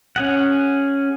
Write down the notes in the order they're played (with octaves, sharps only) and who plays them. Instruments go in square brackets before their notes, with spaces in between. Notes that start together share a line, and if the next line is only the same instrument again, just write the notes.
[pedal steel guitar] C#4 G#4 F#5